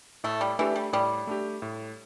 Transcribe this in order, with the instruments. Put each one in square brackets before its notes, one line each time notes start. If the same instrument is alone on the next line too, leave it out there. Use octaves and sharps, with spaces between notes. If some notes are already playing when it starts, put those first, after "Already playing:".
[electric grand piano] A2 [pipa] A3
[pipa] G3
[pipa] E3 [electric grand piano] A3 D4 G4
[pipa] G3
[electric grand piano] A2 [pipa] G3
[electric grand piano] A3 D4 G4
A2